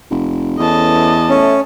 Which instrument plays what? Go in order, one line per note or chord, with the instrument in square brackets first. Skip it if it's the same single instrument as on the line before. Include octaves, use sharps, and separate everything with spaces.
[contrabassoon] F1
[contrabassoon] E2 [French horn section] E3 C#4 A4 [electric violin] D#5 A5
[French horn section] A3 [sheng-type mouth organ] C#4